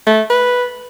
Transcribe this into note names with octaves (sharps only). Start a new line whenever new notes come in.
A3
B4